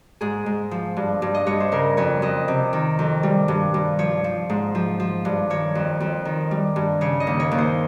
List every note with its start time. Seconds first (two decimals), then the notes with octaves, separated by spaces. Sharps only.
0.21 G#2 G#4
0.46 G#2
0.71 F3
0.97 G2
1.22 G2
1.35 D#5
1.47 G2 C#5
1.60 C5
1.72 C#3 A#4
1.97 F2 C#5
2.22 F2 D#5
2.48 C3
2.73 D#3
2.99 F2
3.23 G3
3.48 G2
3.74 G2
3.99 F3 C#5
4.24 F3
4.50 G#2
4.75 F3
5.00 F3
5.25 G2
5.50 D#3 C#5
5.75 F2
6.00 F2
6.25 D#3
6.51 G3
6.76 G2
7.01 C#3 C#5
7.20 D#5
7.27 D#2
7.40 C#5
7.51 D#2
7.58 C5